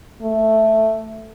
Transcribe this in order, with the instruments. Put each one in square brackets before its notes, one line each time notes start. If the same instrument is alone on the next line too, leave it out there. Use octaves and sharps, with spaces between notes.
[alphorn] A3